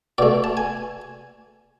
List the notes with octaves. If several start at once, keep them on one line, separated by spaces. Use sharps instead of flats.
B2 A3 D5
A5
G#5